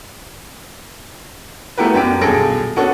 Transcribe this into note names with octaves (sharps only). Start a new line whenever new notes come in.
A3 B3 E4 G4 A#4 B4
F#2 D4 G4 D7
D#1 B1 G#4 A4 A#6 D7
B3 C#4 D4 F#4 A4